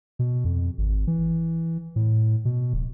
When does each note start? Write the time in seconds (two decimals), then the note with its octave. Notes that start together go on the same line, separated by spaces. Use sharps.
0.19 B2
0.45 F2
0.78 G#1
1.07 E3
1.96 A2
2.45 B2
2.73 D1